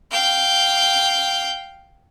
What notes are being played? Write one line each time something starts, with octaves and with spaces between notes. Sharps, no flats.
F5 G5